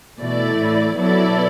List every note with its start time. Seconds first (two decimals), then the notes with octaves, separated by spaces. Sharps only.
0.19 B2 E3 A3 E4 D5
0.59 A2
0.98 B2 F#3 B3 E4 A4 D5